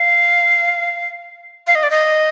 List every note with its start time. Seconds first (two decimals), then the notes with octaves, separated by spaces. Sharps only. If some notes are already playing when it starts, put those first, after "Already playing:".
Already playing: F5
1.67 F5
1.75 D#5
1.83 D5
1.90 D#5